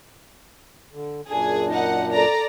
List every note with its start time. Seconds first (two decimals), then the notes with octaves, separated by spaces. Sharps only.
0.92 D3
1.28 F#2 A#2 D4 G#4
1.72 D#4 F#5
2.12 A4 D5 A#5